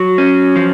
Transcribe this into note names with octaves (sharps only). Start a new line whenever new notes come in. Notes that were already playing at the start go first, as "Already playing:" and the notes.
Already playing: F#3
C#4
F3